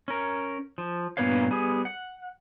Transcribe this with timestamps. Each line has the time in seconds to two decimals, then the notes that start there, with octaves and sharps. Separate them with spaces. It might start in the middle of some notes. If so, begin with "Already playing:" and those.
0.08 C#4 A#4
0.78 F3
1.17 G2 A#2 B3 B4 C#5 F5
1.51 G3 B3 G#4
1.85 F#5